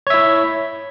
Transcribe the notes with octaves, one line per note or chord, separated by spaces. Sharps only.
E4 C#5 E5